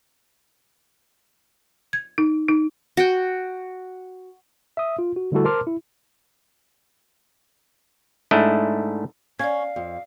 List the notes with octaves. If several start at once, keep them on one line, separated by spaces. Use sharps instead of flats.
G#6
D#4
D#4
F#4 G5
E5 D#6
F4
F#4
D3 G3 A3 E4 F#4 A4
A#4 C5 A5 C6 D6 F6
E4
G#2 A3 D4 E4 D#5
C#4 D5 F5 G#6
F2